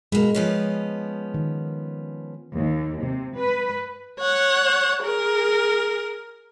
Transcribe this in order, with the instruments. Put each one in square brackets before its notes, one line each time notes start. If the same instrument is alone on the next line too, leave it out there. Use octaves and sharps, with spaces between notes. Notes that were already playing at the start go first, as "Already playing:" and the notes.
[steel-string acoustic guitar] B2 A#3 [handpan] G#3
[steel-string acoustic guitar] F3 B3 C#4
[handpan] D#3
[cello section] D#2
C3
B4
[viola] C#5 F#5
G#4 A#4